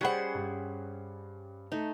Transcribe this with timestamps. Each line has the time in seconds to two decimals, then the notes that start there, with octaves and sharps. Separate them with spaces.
0.01 G3 C#4 G#4 C5 F#5 B5 F#6 B6
0.35 G2
1.72 A3 D#4